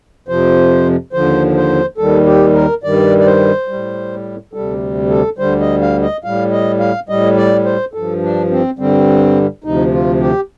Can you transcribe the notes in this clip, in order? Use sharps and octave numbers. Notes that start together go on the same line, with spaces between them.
F2 C3 F3 C5
D#2 D3 F3 C5
C5
D#2 D#3 G3 A4
G4
A#4
G2 D#3 G3 D5
D5
C5
G3
A2
D2 C3 G3 A4
A4
D2 D3 G3 C5
D#5
F5
D#5
A2 G3 F5
D#5
F5
A2 G3 D#5
D5
C5
G2 F3 A4
D4
C4
G2 D3 G3 C4
D2 C3 F3 D#4
F4
G4